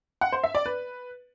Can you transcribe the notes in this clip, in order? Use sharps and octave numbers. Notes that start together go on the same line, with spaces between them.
F#5
C5
E5
D5
B4